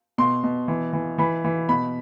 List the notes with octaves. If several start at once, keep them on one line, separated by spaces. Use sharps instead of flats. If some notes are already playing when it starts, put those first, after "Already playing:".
B2 C6
B2
E3
E3
E3 B5
E3
B2 B5